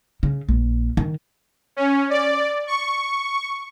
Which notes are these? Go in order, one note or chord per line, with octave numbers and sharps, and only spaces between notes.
C#3
A#1
D#3
C#4
D5
C#6